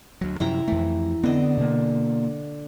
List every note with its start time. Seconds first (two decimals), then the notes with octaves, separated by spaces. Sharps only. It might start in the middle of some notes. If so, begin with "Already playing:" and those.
0.21 D2 F#3
0.40 F#2 C3 F3 E4 G5 A#5
0.68 F2 E3 A3
1.24 D3 B3 C4 D#5
1.57 B2 A#3